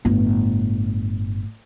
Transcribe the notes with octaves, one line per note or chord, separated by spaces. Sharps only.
G1 A2